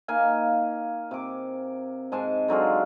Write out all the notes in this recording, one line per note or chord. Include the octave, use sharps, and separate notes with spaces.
A#3 D#4 F5 G#5
C3 D6
G#2 G#3 G#5 A5
D3 F#3 G#3 F4